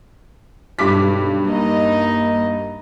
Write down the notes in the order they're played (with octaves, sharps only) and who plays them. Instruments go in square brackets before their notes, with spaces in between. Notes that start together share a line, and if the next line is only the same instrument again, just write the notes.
[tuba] B1 [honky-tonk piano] G2 D6 B6
[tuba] A#3 [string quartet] D#4 D#5